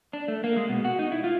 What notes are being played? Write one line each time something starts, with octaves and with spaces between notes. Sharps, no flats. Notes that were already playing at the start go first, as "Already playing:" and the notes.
D4
A3
A#3
G#3
B2
F#4
D#4
E4
F4